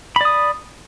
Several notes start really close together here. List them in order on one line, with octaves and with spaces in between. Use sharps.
B5 D5 D#6